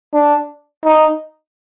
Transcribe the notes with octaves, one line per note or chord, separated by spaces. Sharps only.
D4
D#4